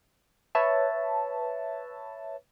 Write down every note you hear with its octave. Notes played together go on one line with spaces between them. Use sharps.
B4 C#5 E5 A5